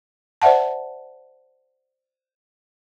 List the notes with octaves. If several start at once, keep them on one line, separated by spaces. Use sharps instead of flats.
C5 D5 E5 F#5 A5